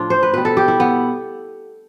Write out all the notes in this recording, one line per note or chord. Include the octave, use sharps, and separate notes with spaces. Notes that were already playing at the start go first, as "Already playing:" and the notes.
Already playing: A2 F3 D4 F4
C5
B4
B2 G3 B4
A4
G4
E4
B3